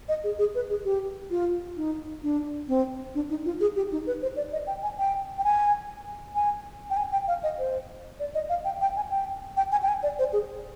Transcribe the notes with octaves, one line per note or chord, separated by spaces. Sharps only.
D#5
G#4
G#4
B4
G#4
G4
F4
D#4
D4
C4
D4
D#4
F4
G#4
G4
D#4
B4
C5
D5
D#5
G5
G#5
G5
G5
G#5
G#5
G5
G#5
G5
F5
D#5
C5
D5
D#5
F5
G5
G5
G#5
G5
G5
G#5
G5
G#5
D5
C5
G#4